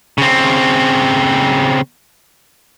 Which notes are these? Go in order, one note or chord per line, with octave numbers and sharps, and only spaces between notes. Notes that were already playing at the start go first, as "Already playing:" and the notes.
C#3 C4